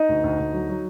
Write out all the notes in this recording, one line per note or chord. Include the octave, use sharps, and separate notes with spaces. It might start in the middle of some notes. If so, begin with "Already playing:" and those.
Already playing: D#4 D#5
D2
D2
D2
F#3
F#3